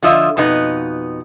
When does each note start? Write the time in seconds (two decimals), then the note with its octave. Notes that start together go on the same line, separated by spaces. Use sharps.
0.03 D3 F3 F4 D#5 E5
0.37 F2 B2 B3 D#4 B4